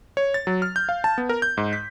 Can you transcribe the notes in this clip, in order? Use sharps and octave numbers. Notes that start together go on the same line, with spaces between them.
C#5
A6
F#3
F6
G6
F5
A5
B3
A#4
G6
G#2
B6